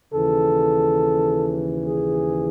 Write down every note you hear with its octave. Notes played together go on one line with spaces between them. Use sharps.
D#2 C#3 E3 A4
G#4